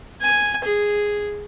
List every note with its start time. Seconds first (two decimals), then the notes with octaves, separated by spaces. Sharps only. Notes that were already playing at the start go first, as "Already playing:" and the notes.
0.22 G#5
0.64 G#4